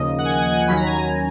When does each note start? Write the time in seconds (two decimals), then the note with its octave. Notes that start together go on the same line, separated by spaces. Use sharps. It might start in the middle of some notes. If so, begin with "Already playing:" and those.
Already playing: D#2 C#3 F3 A#3 D#5
0.18 F#5
0.25 G#5
0.33 F#5
0.39 G#5
0.46 F#5
0.68 D#2 D#3 F#3 C#4 B5
0.77 A#5
0.87 G#5
0.97 A#5